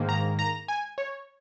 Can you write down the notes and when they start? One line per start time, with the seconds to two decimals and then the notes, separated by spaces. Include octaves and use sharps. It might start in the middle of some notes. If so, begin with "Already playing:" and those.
Already playing: G#2 D#3 A#3
0.09 A#5
0.39 A#5
0.68 G#5
0.98 C#5